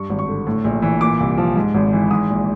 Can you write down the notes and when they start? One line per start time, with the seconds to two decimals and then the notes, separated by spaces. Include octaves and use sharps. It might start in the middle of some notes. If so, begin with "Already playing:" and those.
Already playing: G2 C#6
0.10 G#1
0.19 C#6
0.28 D3
0.47 A2
0.64 A#1
0.82 E3
1.01 A#2 D6
1.20 C2
1.38 F3
1.56 G#2
1.74 G#1
1.93 E3
2.11 G#2 D#6
2.30 A#1